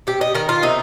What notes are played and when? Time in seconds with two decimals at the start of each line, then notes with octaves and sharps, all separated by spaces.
0.07 C3 G4
0.21 D#5
0.34 D#3 A#4
0.49 F4
0.63 C3 D#4